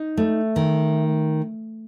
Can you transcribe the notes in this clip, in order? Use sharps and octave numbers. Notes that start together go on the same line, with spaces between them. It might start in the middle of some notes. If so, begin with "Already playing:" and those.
Already playing: D#4
A3
D#3